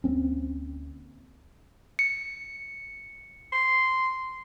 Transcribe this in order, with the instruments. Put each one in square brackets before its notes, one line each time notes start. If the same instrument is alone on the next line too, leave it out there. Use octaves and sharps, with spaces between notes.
[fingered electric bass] D2 A#3 C4 C#4
[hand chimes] C#7
[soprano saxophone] C6